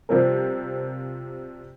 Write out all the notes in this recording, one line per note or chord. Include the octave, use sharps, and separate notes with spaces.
C3 F3 G3 C4 A#4